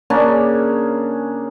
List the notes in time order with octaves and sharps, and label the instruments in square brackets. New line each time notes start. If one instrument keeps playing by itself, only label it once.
[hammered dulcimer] C#3 A#3 C#4 D4